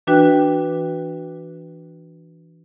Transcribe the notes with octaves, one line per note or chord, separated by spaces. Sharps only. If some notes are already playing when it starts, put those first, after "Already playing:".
E3 D4 F#4 B4 G5 F#6